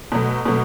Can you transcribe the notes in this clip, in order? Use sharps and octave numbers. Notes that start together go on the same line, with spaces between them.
B2 F#3 A3
B2 F#3 A3